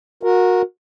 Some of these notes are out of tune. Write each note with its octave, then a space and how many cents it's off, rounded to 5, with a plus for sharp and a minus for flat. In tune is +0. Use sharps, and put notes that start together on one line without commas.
F#4 -25 A#4 +0